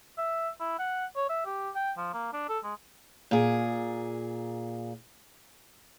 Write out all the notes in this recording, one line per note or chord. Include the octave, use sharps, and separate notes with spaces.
E5
E4
F#5
C#5
E5
G4
G5
F3
A#3
D4
A4
G#3
A#2 G#4